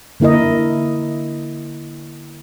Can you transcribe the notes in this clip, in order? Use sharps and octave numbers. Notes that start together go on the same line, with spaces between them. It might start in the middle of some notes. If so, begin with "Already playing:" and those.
D3 A#3 E4 A#4 D#5